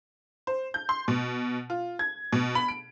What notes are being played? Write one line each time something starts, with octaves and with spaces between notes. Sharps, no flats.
C5
G6
C6
B2
F4
G#6
B2
B5
D7